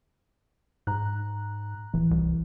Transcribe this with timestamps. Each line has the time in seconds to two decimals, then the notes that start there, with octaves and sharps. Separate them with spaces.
0.87 G#2 A#5 F#6
1.94 D1 E3
2.11 C2